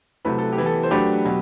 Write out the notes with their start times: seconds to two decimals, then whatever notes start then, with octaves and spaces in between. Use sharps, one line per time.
0.25 C3 F#3 A3 E4 B4
0.38 A4
0.52 G4
0.58 E3 B3 E4
0.66 A4
0.83 C5
0.91 F#3 A3 D4 G4 B4
1.25 B2 F#3